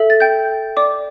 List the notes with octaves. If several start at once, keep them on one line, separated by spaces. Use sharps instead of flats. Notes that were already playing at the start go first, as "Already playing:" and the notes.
Already playing: A4 E5
A6
G5 G6
D5 D6